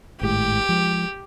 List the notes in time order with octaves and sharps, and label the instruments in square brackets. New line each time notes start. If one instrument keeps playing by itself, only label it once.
[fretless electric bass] G#1 A2 G#3 [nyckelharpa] G4
[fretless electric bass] F3 G#3